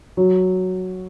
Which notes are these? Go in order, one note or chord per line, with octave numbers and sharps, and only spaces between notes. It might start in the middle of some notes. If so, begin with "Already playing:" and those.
F#3